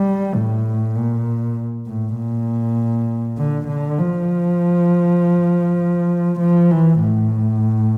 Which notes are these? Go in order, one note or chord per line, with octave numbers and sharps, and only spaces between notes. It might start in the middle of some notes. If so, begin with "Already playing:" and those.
Already playing: G3
A2
A#2
A2
A#2
D3
D3
F3
F3
E3
A2